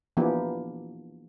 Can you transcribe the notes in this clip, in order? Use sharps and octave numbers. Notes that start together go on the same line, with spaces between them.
E3 F3 A#3 B3 D4 G4